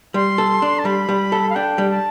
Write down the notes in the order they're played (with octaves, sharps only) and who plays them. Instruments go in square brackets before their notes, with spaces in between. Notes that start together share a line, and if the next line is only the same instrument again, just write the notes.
[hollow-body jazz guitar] G3 [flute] C6
[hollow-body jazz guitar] A4
D4
[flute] A5
[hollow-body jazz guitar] G3 [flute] B5
[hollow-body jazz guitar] G3
A4
[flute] F5
[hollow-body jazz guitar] D4 [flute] G5
[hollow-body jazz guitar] G3
[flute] A5